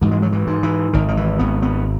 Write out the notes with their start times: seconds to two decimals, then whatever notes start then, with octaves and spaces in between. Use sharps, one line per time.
0.01 G#2 E3
0.11 G#3
0.22 F#3
0.32 E3
0.47 G#2
0.63 E3
0.93 G#1 D#3
1.08 D#3
1.17 E3
1.39 G#1 B3
1.62 B3